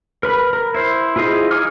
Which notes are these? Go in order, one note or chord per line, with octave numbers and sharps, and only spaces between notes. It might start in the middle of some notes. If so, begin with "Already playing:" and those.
A#4 B4 B5
A#4
E4 C5
E4 F4 G#4 C5 D#5
D#4 G#4 D6 F6